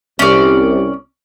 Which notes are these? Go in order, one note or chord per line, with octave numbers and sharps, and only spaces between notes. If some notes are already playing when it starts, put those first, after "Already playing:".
C2 C#4 D5